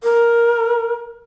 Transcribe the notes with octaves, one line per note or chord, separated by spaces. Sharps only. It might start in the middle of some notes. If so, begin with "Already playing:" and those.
A#4